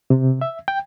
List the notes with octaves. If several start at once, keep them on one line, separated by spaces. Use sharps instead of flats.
C3
E5
G5